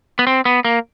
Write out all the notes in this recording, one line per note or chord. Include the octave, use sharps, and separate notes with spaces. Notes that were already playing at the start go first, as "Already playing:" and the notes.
B3
C4
B3
A#3